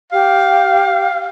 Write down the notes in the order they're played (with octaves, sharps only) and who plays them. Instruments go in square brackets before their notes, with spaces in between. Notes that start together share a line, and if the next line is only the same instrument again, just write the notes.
[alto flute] G4 [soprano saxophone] F5